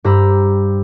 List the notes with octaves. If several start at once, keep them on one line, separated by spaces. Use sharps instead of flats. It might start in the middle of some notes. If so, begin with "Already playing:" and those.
G2 G4 C5 A#5 B5 E6